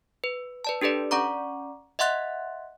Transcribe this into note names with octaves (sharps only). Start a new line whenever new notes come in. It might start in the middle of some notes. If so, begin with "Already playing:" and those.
B4
B4 D5 A5
D4 G4 A4 B4 D5
C#4 D5 F#5 A#5 C#6 D6
D#5 E5 F#5 C6 F#6 A6